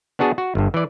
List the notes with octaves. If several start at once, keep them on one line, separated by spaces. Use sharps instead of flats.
B3 D4 F#4 G#4 A5
F#4
G1 G2
E3 D5